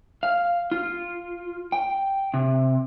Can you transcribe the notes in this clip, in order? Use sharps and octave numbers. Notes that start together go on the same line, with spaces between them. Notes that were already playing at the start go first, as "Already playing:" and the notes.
F5
F4
G5
C3